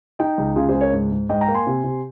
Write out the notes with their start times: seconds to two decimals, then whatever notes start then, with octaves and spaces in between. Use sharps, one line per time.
0.19 D#4 D#5 G5
0.38 C#2
0.56 C#3 F4 G#4
0.69 G#4 C5
0.74 C#2
0.81 A#4 C#5
0.93 G#2
1.12 G#2
1.29 G#2 D#5 G5
1.41 G5 A#5
1.48 A#3
1.55 G#5 C6
1.67 C3
1.84 C3